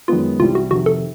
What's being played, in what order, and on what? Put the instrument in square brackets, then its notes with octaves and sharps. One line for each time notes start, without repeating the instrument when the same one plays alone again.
[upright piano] F#2 D#3 G#3 B3 [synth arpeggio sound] F4
[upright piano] C2 C3 E3 G3 [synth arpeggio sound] F4
[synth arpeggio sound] F#4
[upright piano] F2 C3 D#3 [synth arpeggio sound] F#4
[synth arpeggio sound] A4